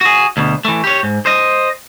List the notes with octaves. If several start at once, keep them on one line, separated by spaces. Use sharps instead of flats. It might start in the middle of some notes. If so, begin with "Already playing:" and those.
F#4 G#4
D2 B2
E3 A3
G4 C#5
G#2
C5 D#5